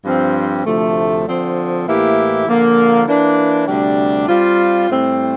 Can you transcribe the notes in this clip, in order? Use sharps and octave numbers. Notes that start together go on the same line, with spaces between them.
G2 F3 C4
D2 C3 F3 A3
D3 F3 C4
A2 E3 A#3 E4 G4
D3 F3 A#3
E3 A#3 D4
D2 C3 G3 D4
G3 C4 F4
A2 G3 C4